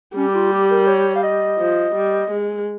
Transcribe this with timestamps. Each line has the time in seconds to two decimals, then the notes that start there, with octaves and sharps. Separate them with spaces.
0.16 G3 C#4
0.28 G4
0.35 F4
0.52 G4
0.70 A#4
0.87 C#5
1.16 F5
1.23 D#5
1.58 F3
1.95 G3
2.31 G#3